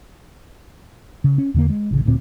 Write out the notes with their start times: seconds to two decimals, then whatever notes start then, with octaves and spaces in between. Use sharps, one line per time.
1.24 C#3
1.38 C#4
1.54 E2 D3 A#3
1.70 G#3
1.91 A1 C#3
2.05 D1 D2 A#2 C4